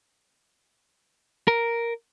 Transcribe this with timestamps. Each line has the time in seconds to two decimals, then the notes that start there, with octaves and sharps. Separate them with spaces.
1.48 A#4